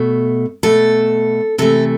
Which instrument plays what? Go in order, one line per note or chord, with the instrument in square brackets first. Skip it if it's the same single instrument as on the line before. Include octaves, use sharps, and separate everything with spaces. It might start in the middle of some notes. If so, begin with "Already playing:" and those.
Already playing: [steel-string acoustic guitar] B2 A3
B2 A3 A4
C3 E3 A3 A4